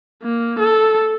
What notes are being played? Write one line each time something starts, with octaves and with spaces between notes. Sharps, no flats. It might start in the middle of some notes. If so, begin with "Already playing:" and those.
A#3
A4